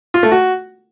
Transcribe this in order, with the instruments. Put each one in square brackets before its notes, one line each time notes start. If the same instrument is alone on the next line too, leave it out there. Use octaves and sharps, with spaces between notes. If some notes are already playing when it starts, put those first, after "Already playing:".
[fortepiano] F4
A3
F#4